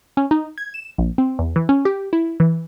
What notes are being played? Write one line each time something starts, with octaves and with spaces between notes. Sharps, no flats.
C#4
D#4
G#6
E7
A#1
C4
E2
E3
C#4
G4
E4
E3